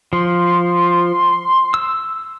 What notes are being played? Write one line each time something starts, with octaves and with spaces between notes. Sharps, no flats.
F3 C6
E6